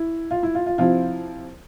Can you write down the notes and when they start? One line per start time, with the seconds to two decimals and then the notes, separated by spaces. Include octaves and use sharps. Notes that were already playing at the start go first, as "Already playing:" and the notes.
Already playing: E4
0.31 F4
0.43 E4
0.55 F4
0.66 F4
0.78 C3 F3 C4 E4 F4